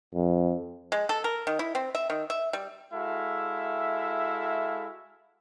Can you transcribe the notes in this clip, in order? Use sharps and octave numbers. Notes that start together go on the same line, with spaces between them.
F2
G#3
A4
A#4
D#3
E4
C4
E5
D#3
E5
G3
G#3 E4 F#4 A4 E5 F5